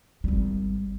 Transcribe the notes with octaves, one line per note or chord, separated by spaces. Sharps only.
G#1 G3